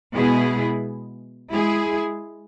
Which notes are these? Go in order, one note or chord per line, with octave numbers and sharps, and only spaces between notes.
B2 G#3 B3 E4 G#4
G#3 E4 G#4